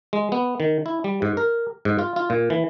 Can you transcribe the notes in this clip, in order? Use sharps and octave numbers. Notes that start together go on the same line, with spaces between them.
G#3
B3
D#3
E4
G3
G#2
A#4
G#2
F4
F4
A#2
E3